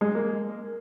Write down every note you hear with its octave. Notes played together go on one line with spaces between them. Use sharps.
G#3
A#3